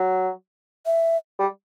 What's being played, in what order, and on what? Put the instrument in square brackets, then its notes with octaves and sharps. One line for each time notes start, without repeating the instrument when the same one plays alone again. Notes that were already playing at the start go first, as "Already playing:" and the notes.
Already playing: [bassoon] F#3
[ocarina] E5
[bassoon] G3